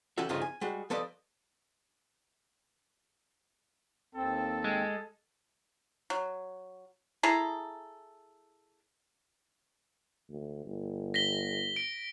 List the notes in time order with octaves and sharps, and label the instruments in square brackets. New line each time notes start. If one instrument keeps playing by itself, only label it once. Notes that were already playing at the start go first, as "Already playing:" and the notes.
[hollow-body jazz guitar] E3 C#4 F#4 G4 A4 E5
G2 C#3 F3 A3 D#4 F4
G#5
G3 G#3 F#4
F3 G3 A4 B4 D5 D#5
[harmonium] D#2 C4 [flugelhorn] A4
[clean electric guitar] G#3
[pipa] F#3
E4 G#4 A4 A#5
[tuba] D2
G1
[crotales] A#6 B6 G7
D7